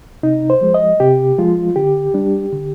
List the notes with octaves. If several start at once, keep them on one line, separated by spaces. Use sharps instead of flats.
C3 D#4
C5
F3 G#3
D#5
C3 G4
F3 G#3 F4
D3 G4
G3 D4
D3